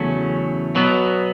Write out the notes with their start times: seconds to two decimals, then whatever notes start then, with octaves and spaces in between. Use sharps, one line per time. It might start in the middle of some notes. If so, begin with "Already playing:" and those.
Already playing: E2 C#3 F#3 A3 C#4
0.75 B2 F#3 B3